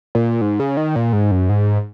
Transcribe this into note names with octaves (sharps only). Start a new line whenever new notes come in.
A#2
G#2
C#3
D#3
A#2
G#2
F#2
G#2